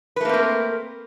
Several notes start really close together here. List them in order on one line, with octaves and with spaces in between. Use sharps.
B4 A3 A#3 C4 A#4